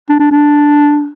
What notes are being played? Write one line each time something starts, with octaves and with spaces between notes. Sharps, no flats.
D4
D4
D4